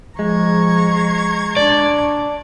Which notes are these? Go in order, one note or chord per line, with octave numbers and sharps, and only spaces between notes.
F3 G#3 A#5 C#6 G#6
D4 D5